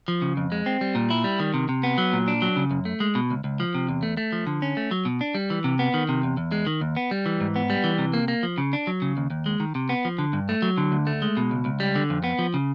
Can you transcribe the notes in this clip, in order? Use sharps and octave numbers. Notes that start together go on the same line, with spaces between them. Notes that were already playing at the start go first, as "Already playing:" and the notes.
F3
C#3
F2
G#3
C4
G3
A#2
E4
G3
D#3
C3
C3
B3
F#3
A#2
D4
F#3
C#3
F#2
A3
G#3
B2
C#2
C#2
F3
C3
E2
A3
A3
F3
D3
C#4
A3
F#3
B2
D4
G3
E3
C3
B3
D#3
C3
E2
E2
G#3
D#3
D#2
B3
G3
E3
G#2
B3
G3
E3
C3
A#3
A#3
F3
C#3
D4
F#3
C#3
D#2
D#2
G#3
D#3
C3
B3
F3
D3
G2
A3
F#3
D3
D2
A3
G#3
B2
C#2
C#2
G3
D3
F2
B3
F3
C#3